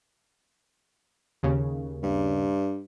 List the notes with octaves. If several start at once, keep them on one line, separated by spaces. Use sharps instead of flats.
D#2 C#3
G2